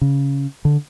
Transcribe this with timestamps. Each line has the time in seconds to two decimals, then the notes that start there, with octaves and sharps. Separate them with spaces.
0.01 C#3
0.65 D3